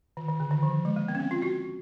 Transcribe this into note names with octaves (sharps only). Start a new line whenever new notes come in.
D#3
D#3
D3
D#3
F3
G#3
A#3
B3
C#4
C4
F4
F#4